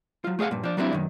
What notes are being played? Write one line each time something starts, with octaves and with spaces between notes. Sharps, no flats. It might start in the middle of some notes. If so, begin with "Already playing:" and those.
F#3 F4
A3 G#4 D5 F5 F#5
G2 A#2
F3 D4
F#3 G3 A#3 C4 D4 E4
F#2 D#3